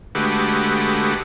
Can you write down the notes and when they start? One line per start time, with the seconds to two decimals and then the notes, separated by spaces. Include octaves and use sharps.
0.15 D3 G#3 A3 F#4 G4 B4